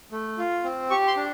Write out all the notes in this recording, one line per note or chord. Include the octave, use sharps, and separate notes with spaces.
A3
F4
C4
G4 C#6
C6
D4